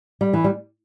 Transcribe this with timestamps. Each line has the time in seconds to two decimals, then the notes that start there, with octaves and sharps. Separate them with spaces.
0.21 G3
0.33 E3
0.44 G3